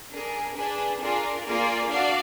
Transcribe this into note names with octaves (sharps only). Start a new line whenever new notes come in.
D4 G#4 A#4
D4 G#4 B4
D4 F4 G#4 A#4 D5
A#3 F4 G#4 A#4 D5
D4 F#4 D5 F5